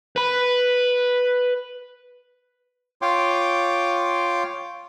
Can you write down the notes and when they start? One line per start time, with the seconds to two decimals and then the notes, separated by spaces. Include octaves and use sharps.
0.16 B4 B5
3.02 F4 C#5 G5 C6 D6